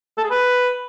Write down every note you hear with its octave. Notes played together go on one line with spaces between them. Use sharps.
A4
G#4
B4